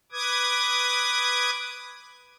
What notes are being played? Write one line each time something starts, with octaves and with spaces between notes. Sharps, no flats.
B4 D6 D#6 G#6